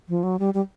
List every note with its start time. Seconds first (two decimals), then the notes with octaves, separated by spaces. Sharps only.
0.09 F3
0.23 F#3
0.39 G3
0.54 G3